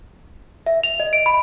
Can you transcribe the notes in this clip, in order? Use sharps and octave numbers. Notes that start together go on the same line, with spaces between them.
E5
F7
D#5
D7
B5